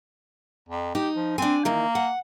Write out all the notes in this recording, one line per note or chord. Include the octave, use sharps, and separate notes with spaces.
F2
D#4 G4
F3
C4 D4 G#5
D#3 E3 A#3
F#5